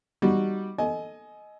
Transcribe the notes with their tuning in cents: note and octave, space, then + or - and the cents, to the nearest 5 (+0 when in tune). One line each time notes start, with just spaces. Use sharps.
G3 +0 D#4 +0 F#4 +0
A4 +0 D#5 +0 G#5 +25